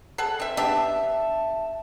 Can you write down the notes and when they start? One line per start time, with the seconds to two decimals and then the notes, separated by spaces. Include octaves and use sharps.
0.18 G#4 A4 F#5
0.40 C4 E5
0.57 B3 D4 G4 E5 A5